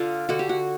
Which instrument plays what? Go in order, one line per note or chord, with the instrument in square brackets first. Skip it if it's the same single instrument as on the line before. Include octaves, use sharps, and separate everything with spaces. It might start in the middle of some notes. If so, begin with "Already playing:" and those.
Already playing: [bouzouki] D3 [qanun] F4
[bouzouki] D3 [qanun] F#4
[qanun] G4
F#4